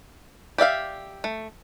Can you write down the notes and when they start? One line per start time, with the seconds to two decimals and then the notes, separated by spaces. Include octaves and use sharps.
0.58 G4 D5 E5 F5
1.24 A3